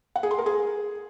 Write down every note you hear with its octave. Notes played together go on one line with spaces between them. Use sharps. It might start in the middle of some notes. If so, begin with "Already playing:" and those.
F#5
G#4
C6
A#4
G#4